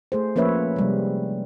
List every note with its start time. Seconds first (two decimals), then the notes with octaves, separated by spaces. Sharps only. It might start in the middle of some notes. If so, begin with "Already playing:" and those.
0.12 A3 G#4 C5
0.36 F3 A#3 C#4 B4 C#5 E5
0.76 C3 G3 G#3